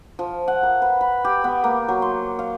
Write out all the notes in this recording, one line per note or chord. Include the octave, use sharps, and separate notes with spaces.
F3
F#5
A#4
B4
B5
G4
B3
A#3
F#3
C6
F5